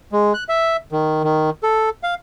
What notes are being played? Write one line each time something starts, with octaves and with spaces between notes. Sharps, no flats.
G#3
F#6
E5
D#3
D#3
A4
F5